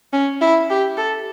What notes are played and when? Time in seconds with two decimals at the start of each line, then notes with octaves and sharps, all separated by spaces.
0.13 C#4
0.41 E4
0.70 G4
0.97 A4